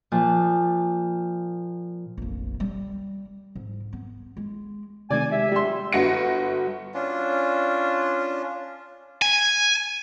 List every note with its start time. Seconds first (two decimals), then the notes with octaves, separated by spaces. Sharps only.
0.12 A#2 F3
2.18 F1 A#1
2.60 G3
3.55 G#2
3.93 B3
4.37 G#3
5.11 C3 D#3 A3 D5 G#5
5.32 G#3 G4 E5
5.52 G3 C6
5.93 G1 F#4 A#6 C#7
6.94 C#4 D4 F4
9.22 G#5